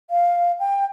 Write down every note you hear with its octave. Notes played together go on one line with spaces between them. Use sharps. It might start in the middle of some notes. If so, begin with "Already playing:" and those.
F5
G5